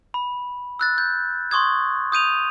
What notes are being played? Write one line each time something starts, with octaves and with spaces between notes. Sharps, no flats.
B5
E6 F#6 A6
G6
C6 C#6 D#6 G#6
D#6 G6 D#7 F7